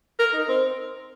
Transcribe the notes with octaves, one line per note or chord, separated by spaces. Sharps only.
A#4
D#4
C4